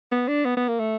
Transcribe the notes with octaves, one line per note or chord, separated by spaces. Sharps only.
B3
D4
B3
B3
A#3
A3